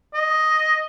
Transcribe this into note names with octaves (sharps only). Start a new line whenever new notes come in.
D#5